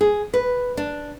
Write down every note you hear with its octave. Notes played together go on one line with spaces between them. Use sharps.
G#4
B4
D4